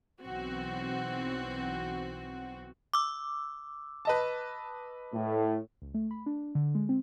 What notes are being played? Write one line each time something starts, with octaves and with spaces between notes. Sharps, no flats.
B1 E3 C4 F#4
D6 E6
B4 D#5 A5
A2
C#2
A3
B5
D4
D3
G#3
C4